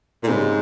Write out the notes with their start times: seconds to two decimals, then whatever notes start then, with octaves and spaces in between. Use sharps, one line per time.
0.23 A#2
0.28 G#2 C#3 G3 C4 D#4 G#4